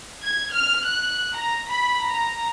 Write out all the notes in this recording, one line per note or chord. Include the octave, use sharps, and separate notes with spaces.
G#6
F6
F#6
A#5
B5
A#5